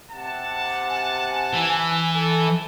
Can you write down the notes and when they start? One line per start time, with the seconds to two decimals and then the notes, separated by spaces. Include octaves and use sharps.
0.12 C3 F#5 A5
0.90 G#5
1.53 E3
2.16 A4